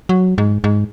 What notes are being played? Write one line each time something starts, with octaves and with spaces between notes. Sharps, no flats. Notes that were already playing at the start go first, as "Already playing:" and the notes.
F#3
G#2
G#2